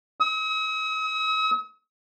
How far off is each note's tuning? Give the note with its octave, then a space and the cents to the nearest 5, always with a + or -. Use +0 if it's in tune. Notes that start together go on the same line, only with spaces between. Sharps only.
D#6 +45